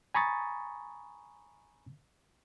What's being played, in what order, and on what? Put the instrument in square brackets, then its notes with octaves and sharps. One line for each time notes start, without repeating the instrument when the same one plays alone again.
[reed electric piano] G#5 A#5 B5 C#6 D#6 A6